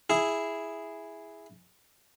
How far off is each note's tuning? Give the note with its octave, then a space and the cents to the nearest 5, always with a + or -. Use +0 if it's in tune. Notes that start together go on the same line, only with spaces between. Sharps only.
E4 +0 G#4 +0